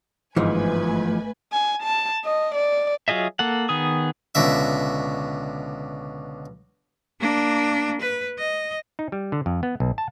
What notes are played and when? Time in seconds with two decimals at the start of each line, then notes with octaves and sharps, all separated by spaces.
0.36 G1 G#2 E3 F3 A3 B4 D#5 G#5
1.53 G#5
1.83 A5
2.24 D#5
2.55 D5
3.08 F#3 F4 G#4 D#5 E5
3.39 A#3 A4 F#5
3.69 D#3 B3 G#4 D#6
4.35 C#2 B2 D3 E5
7.20 A#3 D4
8.01 B4
8.38 D#5
8.99 D#4
9.12 G3
9.32 D3
9.46 F2
9.63 B3
9.80 B1
9.98 A5